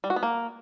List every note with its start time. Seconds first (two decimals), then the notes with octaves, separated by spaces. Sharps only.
0.04 G3
0.10 F#4
0.16 B3
0.23 A#3